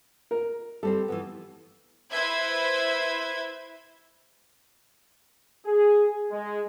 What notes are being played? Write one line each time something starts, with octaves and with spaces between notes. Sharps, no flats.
A#4
G3 C4 A4 C5
E3 F3 B3
E4 B4 C5 E5 G#6
G#4
G#3